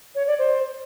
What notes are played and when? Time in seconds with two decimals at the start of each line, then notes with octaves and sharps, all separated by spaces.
0.15 C#5
0.27 D5
0.39 C5